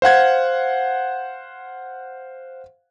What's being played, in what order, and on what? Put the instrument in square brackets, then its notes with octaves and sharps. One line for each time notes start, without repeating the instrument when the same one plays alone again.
[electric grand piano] C5 F5 F#5 G#6